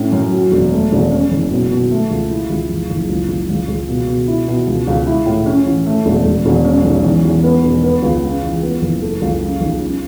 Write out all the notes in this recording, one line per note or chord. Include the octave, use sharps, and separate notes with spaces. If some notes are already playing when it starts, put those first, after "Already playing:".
Already playing: A2 C#4
F#2
F#3
E1
A3
E1
C#4
F#1
B2
B2
A3
C#2
E4
C#2
F#1
F#1
C#2
C#2
C#2
C#2
B2
B2
E4
B2
C#2
C#2
E4
A2
C#4
A1
A3
E1
E1
E1
C#4
B1
E2
E2
B3
E1
B3
C#2
C#4
E2
B3
F#1
A4
C#2
C#4
B1
C#4